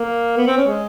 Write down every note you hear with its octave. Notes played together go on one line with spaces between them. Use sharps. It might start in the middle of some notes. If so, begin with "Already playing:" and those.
Already playing: A#3
B3
C4
C#4
G#3